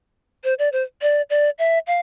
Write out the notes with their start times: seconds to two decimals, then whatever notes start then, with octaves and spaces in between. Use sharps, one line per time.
0.44 C5
0.59 D5
0.72 C5
1.02 D5
1.30 D5
1.59 E5
1.87 F5